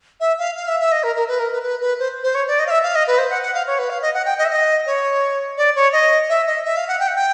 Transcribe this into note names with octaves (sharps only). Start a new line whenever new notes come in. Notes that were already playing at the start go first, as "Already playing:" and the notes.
E5
F5
F5
E5
E5
D#5
A#4
A#4
B4
A#4
B4
B4
B4
C5
C5
C#5
D5
D#5
F5
E5
F5
D#5
B4
C5
F#5
F#5
F5
C#5
B4
F5
D#5
F#5
G5
D#5
E5
D#5
C#5
D5
C#5
D#5
E5
D#5
E5
F5
F#5
G5
F#5
G5